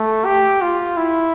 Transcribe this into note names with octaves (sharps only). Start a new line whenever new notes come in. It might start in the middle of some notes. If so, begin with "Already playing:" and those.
Already playing: A3
G4
F4
E4